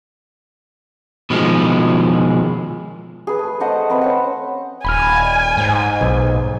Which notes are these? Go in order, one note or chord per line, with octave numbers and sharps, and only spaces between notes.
B2 D#3 F3 G#3
G#4 B4
A3
A3 C5 D#5 F#5
C4 B4 E5
C#4 C5 F#5
D#1 G#5 B5 F6
G#2
B1